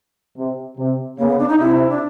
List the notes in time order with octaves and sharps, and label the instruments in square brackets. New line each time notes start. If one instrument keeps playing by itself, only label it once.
[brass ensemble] C3
C3
[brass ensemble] C#3 [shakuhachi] A#3
[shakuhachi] B3
D4
D#4
[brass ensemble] C3 [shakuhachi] E4
[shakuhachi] D4